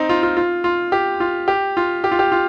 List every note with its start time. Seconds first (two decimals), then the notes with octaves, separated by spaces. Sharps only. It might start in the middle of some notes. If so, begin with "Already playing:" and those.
Already playing: C4 D#4
0.09 F4
0.23 F4
0.37 F4
0.64 F4
0.92 G4
1.20 F4
1.48 G4
1.77 F4
2.04 G4
2.12 F4
2.19 G4
2.32 F4